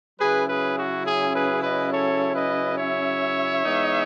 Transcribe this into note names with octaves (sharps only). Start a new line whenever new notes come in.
C#3 F#3 C#4 E4 G#4 B4
G#4 B4
F#4
G#4
G#4 B4
B4 D#5
A4 C#5
B4 D#5
C#5 E5
E3 G#3 B3 D#4